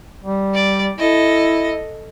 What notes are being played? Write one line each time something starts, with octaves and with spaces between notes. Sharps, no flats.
G3
D5
E4 A4 D#5